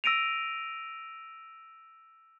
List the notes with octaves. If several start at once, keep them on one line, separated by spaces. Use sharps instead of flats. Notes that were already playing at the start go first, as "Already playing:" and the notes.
E6 A#6 D7 D#7 F7